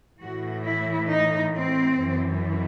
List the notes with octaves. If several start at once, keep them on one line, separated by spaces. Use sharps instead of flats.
A2 E3 F#4
E4
D#4
C4
F#2 E3